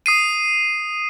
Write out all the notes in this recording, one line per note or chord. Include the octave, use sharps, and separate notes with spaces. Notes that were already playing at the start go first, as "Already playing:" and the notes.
D#6 C7 D#7